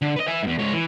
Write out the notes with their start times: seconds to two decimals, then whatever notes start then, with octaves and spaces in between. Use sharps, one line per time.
0.02 D3
0.16 B4 D#5
0.28 E5 G#5
0.43 E2 G#2
0.59 G#2 C#5
0.73 E3